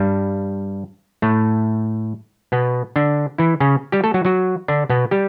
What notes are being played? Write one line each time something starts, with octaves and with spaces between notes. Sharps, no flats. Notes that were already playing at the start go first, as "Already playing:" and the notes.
Already playing: G2 G3
A2 A3
B2 B3
D3 D4
E3 E4
C#3 C#4
G3 G4
A3 A4
F#3 F#4
F#3 F#4
D3 D4
B2 B3
G3 G4